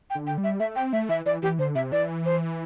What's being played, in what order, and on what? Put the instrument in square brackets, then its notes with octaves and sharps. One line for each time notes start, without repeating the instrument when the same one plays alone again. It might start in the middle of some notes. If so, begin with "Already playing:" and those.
[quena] G5
[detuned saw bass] D3
[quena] G5
[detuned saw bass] G3
[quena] E5
[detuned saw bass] A3 [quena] E5
[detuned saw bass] C4 [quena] G5
[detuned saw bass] A3 [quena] E5
[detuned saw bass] E3 [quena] E5
[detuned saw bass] E3 [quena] D5
[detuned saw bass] E3 [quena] G4
[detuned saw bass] D3 [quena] C5
[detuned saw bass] C3 [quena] E5
[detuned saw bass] E3 [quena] D5
[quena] C5